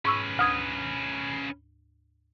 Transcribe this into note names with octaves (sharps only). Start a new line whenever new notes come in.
G#2 C#4 B4 C#6 E6
D2 D#6 G#6